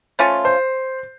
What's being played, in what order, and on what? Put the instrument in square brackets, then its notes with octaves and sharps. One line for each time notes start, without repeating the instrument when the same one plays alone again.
[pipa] F3 A3 C#4 F4
[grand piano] C5